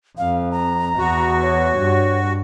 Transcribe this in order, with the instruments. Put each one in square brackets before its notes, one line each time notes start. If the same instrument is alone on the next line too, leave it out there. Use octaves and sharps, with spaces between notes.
[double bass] F2 [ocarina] F5
[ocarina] A#5
[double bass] E2 [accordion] F#4
[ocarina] C#5
[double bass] G2